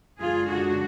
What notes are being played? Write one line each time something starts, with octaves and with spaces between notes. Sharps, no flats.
F#2 D3 G#3 D4 F4 G#4
F#4